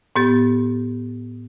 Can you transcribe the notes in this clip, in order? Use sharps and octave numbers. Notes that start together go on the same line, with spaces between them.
A2 B3 G4 A6